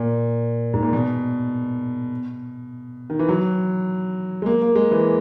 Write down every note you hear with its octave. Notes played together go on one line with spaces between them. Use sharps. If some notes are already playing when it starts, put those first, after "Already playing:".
Already playing: A#2
G#2
A#2
B2
D#3
E3
F#3
G#3
A#3
A#3
G#3
E3